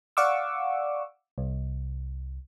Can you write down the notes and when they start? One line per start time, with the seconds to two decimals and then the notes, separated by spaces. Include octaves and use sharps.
0.17 D5 F5 F#5 C#6 D6 E6
1.38 C2